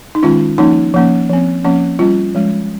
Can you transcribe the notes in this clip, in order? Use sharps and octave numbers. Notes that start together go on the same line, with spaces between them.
D#4
D#3 G#3 C#4 F4
F3 A#3 C#4 D#4
F3 A#3 C#4
F3 C4
F3 A#3 C#4
G3 C#4 F4
F3 G#3 C#4